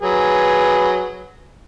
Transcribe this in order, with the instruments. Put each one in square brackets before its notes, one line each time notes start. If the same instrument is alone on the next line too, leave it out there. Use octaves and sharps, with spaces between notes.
[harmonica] F#3 G#4 B4